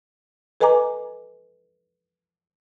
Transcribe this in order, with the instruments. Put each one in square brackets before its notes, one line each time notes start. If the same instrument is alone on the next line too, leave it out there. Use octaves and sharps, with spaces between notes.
[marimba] A4 B4 D#5 G#5 A#5 D6